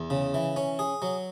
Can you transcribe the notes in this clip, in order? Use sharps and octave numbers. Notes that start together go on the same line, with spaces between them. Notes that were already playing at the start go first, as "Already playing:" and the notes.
Already playing: E2
C#3
E3
C#4
G#4
F#3